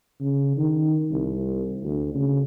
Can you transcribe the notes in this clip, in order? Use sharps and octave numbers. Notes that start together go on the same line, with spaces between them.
C#3
D#3
C2
D2
C#3